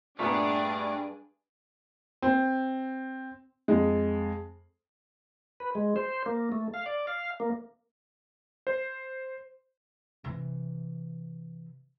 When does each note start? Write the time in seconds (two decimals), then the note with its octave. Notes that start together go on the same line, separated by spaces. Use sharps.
0.19 G2 A#2 A3 B3 D4 G#4 D5
2.22 C4
3.68 F2 G#3
5.60 B4
5.75 G#3
5.96 C5
6.26 A#3
6.52 A3
6.74 F5
6.86 D5
7.07 F5
7.40 A#3
8.67 C5
10.24 C3 E3